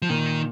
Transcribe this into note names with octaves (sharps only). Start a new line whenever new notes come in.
F3
A#2 D#3